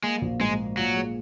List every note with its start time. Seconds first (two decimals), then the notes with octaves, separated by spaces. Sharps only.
0.03 G#3 A#3
0.21 A#1
0.40 G#2 G#3
0.60 A#3
0.77 A#2 F#3
0.96 G#3